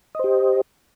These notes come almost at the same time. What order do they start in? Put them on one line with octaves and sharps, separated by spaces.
D#5 C5 G4